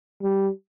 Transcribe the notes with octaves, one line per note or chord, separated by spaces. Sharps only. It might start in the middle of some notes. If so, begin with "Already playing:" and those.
G3